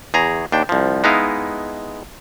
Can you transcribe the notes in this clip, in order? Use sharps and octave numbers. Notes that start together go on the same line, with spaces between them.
E2 G#4 A#5
D#2 D4 G5
C2 F3
G#3 B3 D#4 E4 F5